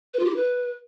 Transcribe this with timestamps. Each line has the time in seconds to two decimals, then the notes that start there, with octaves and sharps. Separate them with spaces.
0.14 B4
0.19 F4
0.25 G4
0.31 E4
0.36 B4